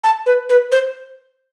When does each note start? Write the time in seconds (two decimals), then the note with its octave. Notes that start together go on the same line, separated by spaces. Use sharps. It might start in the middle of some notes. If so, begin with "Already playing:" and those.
0.04 A5
0.26 B4
0.49 B4
0.72 C5